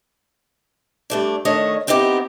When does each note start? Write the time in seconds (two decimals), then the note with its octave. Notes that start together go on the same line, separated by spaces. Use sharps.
1.10 G2 A3 D4
1.45 D#3 A3 D4 C#5 D#5
1.87 B3 C4 D#4 E4 G4